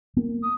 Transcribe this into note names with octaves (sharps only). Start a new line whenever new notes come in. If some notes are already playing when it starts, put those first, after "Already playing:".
A#3
D#6